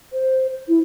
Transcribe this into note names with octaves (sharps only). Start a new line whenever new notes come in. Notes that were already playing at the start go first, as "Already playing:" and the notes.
C5
E4